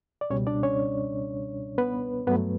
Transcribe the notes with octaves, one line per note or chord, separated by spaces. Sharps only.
D5
C#2 B2 G3 C#4 C#5
D4 D5
C#4 C#5
B3 B4
G2 F#3 A3 B3 B4